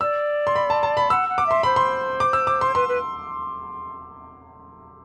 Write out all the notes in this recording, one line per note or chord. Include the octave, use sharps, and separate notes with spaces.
D5 E6
C6
B5
A5
A5
B5
F#5 E6
F#5
D6
E5 C6
C5 B5
C6
D6
E6
D6
C6
B4 C6
B4